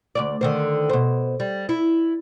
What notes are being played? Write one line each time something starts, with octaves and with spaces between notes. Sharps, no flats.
D2 G#2 D5
D3 D#3 C5
B2 C5
G3
E4